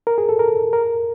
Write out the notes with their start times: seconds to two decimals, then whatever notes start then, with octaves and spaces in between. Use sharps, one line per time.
0.07 A#4
0.18 G#4
0.29 A4
0.39 A#4
0.73 A#4